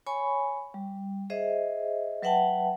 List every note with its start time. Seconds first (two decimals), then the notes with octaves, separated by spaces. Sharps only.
0.07 C#5 G#5 B5 C#6
0.74 G3
1.30 G#4 C5 D#5 E5
2.22 F#3 B4 E5 F#5 G5 A5